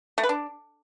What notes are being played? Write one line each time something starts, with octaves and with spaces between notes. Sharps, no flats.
A3
B4
D4